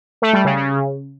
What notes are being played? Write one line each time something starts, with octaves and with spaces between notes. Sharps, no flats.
A3
G3
C#3
C#3